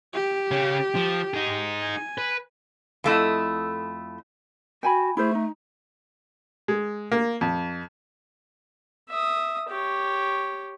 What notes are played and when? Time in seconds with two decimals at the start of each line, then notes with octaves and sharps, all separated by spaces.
0.14 G4
0.51 C#3 C#4
0.95 F3
1.34 D#4 G#4
1.83 G#5
2.18 B4
3.04 F2 A3 E4 D#5
4.83 F#4 G5 G#5 B5
5.17 A3 E4 G#4 C5
5.35 D#4
6.68 G#3
7.12 A#3
7.41 F2
9.09 E5 D#6
9.69 G4 C#5